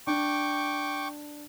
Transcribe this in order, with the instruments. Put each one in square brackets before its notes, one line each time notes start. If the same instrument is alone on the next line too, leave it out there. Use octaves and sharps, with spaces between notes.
[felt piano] D4 [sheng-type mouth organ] G5 C#6 D6